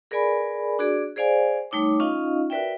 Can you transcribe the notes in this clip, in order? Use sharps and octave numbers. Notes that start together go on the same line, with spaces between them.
G#4 A#4 B4 D5 G#5 B5
D4 F#4 G#4 D5
G#4 C5 D5 F5 G#5
G3 A3 D#4 C#5 D6
C#4 D#4 F4 D#5 F5
F#4 A#4 B4 D5 E5 G5